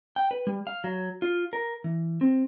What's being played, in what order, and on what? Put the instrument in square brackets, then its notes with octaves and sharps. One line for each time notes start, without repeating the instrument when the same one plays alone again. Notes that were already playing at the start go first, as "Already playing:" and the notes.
[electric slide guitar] G5
B4
G3
F5
F#3
F4
A#4
E3
C4